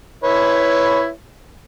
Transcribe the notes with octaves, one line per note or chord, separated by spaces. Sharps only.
E4 B4 C#5